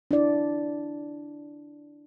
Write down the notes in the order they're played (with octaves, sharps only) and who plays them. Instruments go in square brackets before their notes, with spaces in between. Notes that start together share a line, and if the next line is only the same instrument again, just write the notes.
[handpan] D4 E4 D5